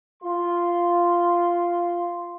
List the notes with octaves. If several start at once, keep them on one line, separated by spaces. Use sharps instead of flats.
F4 C6